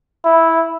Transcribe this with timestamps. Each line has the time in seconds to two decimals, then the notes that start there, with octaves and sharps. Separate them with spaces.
0.25 E4